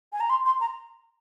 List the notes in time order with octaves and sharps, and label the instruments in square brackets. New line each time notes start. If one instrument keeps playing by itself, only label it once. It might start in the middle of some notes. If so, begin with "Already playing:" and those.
[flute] G#5
A#5
C6
C6
A#5